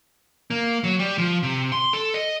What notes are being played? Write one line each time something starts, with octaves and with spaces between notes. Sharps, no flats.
A#3
F#3
G3
F3
C3
C6
A4
D#5